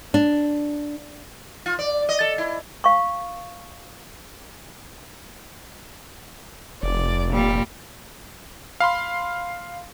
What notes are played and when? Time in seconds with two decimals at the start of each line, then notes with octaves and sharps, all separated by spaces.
0.14 D4
1.66 F4
1.79 D5
2.09 D#5
2.21 A4
2.38 E4
2.84 F5 C#6
6.83 F1 D5
7.30 A#2 G3
8.80 F5 B5 C6